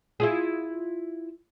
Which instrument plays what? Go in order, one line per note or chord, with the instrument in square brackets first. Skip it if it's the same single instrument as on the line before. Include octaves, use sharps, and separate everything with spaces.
[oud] E4 F4 G#4